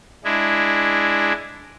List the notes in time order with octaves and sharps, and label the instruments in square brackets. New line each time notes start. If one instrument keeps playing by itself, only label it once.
[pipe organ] G#3 D4 E4